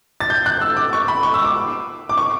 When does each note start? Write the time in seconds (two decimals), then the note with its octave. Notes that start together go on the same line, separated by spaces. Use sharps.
0.20 A6
0.30 G6
0.46 F#6
0.61 E6
0.77 D6
0.93 C#6
1.08 B5
1.23 C#6
1.34 E6
1.44 D6
2.09 D6
2.17 C#6